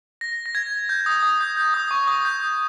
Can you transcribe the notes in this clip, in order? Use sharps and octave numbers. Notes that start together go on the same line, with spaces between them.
A#6
A#6
G#6
G6
D#6
D#6
G6
G6
D#6
C#6
D#6
G6